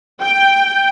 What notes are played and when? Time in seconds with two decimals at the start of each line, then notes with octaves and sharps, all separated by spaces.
0.21 G5